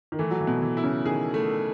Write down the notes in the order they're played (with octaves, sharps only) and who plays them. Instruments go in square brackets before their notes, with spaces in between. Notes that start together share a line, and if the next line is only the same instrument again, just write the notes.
[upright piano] D#3
[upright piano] E3 [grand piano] A3
[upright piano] F#3
E3
[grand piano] B2
[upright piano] E3
[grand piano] E4
[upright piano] C#3
[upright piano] D#3 [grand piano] G#4
[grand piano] A3